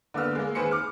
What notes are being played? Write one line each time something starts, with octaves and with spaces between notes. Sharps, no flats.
D3 A#3 B3 E6 F6
G#3 A#3
D#3 G#4 B4 C5 C#7
D6 F6